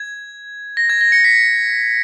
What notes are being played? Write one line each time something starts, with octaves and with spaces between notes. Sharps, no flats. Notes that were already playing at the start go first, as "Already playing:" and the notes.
Already playing: G#6
A#6
G#6
A#6
A#6 C#7
B6